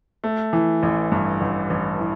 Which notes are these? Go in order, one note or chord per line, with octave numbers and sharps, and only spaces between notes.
A3
E3
A1
G2
A1
A1
E3